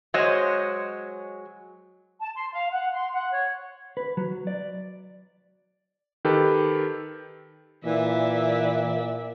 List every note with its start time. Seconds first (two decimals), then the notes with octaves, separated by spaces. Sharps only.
0.14 F#3 G#3 C5 C#5 D#5
2.21 A5
2.35 C6
2.53 F5
2.73 F#5
2.93 C6
3.14 F#5
3.31 C#5
3.97 B4
4.17 F#3
4.47 D5
6.25 D#3 G4 A4 B4
7.85 A#2 E3 D5 E5